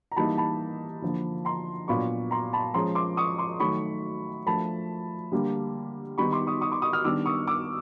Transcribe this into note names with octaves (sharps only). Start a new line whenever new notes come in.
A#5
E3 G3 A#3 D#4 A5 B5
A5 B5
D3 F3 A#3
A#5 C6
A#2 F#3 B3 D4 B5 C#6
A#5 C6
A5 B5
F3 G#3 C#4 A#5 C6
C6 D6
C#6 D#6
C6 D6
D#3 F#3 A3 B5 C#6
F3 A3 D4 A5 B5
D3 G3 A#3
D#3 G3 B3 D#4 B5 C#6
C6 D6
C#6 D#6
C#6 D#6
C6 D6
C#6 D#6
D#6 F6
D#3 G3 B3 D4 D6 E6
C#6 D#6
D6 E6